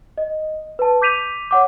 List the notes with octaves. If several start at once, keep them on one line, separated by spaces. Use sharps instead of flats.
D#5
B4 A5
D6 G6 B6 D#7 F7
C#5 F#5 D6